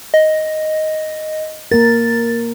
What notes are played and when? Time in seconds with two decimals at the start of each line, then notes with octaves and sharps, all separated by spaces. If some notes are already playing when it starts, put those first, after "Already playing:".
0.14 D#5
1.72 A#3 A#4 A6